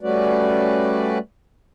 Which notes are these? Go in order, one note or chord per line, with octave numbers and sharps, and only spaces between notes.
G3 A3 C#4 F#4 B4 D5